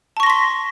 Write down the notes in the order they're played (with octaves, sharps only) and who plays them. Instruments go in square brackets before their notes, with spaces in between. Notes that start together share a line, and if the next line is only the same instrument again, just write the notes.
[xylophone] A5
C#6
A#6
C6
B6